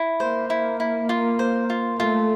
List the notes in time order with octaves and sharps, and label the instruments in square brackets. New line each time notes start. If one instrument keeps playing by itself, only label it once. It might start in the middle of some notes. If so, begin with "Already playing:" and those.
Already playing: [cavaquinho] E4
[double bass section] A#3 [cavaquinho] C5
[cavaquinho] E4
E4
F4
C5
F4
[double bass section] A3 [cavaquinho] F4